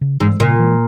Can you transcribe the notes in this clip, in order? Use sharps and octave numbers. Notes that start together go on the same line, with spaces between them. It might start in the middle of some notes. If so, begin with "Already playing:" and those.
C#3
G#2 E3 G#3
A#2 C#3
E3 G#3